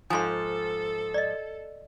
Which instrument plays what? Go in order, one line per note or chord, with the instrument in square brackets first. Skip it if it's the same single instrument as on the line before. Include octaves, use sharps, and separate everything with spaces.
[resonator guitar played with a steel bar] G#2 F3 [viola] A4 [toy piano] G#5 A5 C6
[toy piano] D5 D#5